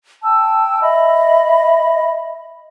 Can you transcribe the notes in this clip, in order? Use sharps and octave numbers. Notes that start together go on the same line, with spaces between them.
G5 A5 E6
D#5 E5 B5